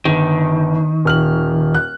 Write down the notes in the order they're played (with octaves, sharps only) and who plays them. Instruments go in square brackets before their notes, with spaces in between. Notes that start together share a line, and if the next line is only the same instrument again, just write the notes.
[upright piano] G1 [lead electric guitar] D#3
[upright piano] D#1 F6 F#7
F#6